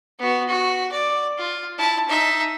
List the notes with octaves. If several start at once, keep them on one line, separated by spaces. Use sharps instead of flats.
B3 F#4
F#4
D5
F4
E4 A5
D#4 E5